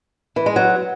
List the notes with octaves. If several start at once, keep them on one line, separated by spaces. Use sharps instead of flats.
E3
G#3
F#3